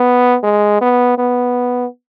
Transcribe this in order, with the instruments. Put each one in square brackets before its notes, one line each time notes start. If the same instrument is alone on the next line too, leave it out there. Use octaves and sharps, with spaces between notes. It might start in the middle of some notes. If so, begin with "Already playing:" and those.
Already playing: [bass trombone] B3
G#3
B3
B3